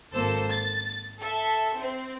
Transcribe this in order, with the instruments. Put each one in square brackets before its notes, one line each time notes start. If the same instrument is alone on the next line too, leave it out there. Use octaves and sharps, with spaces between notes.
[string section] G#1 A#3 A4 C5 E6
A6
A4 E5
C4